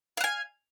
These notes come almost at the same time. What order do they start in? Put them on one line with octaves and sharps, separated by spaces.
F5 F#5 G#5